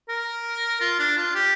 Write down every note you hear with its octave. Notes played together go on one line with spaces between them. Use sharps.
A#4
F4
D4
F4
G4